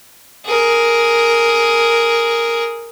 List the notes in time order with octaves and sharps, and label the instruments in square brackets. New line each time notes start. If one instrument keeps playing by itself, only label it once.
[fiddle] G#4 A#4